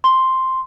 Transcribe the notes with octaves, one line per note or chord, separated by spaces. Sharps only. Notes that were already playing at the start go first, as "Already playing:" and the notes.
C6